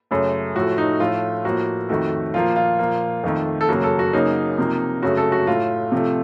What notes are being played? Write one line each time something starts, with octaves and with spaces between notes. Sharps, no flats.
F#2 C#3 A3
A2 F3 A3 F#4
D#4
A2 F3 A3 F4
A2 F3 A#3 F#4
F2 D#3 A3 F#4
A#2 F3 A#3 F4
F4
A#2 F3 A#3
F2 D#3 A3
A4
F#2 C#3 F#3 A#3 F#4
A4
F#4
F#2 C#3 F#3 A#3 D#4
C3 F3 A#3
F#2 C#3 A3 F#4
A4
F#4
A2 A3 F4
C3 F3 A3